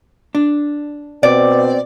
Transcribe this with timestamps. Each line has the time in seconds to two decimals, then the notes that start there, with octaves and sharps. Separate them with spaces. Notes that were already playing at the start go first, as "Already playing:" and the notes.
0.35 D4
1.23 B2 C4 D5